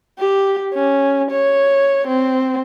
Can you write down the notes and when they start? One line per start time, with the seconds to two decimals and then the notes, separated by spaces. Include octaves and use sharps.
0.19 G4
0.74 C#4
1.31 C#5
2.07 C4